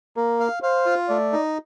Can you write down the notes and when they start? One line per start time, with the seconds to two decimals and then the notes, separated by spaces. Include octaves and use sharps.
0.16 A#3 A#4
0.40 F5
0.63 C5 F5
0.86 F4
1.09 A3 D5
1.33 D#4